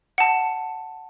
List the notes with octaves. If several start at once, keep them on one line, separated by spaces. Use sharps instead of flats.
F#5 A5